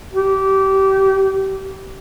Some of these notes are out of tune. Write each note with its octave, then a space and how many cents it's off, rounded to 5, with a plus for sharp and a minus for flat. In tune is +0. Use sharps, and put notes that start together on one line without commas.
G4 -25